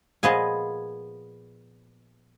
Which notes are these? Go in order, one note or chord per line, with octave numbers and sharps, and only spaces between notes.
A#2 F3 B3 G#4 D#5 G#5